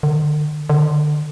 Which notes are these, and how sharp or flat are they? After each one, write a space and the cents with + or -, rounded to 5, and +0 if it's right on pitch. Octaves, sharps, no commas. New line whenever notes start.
D3 +40
D3 +30